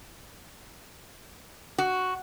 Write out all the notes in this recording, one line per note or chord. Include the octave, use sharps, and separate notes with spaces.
F#4